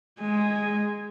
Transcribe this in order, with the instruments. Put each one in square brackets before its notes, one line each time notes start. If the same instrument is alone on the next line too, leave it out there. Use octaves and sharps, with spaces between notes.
[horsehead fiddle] G#3 G#5